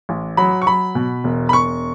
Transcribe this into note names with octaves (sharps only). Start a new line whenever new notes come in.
A1
F#3 B5
C#6
F#3 B5
B2
E1
B5
E1 C#6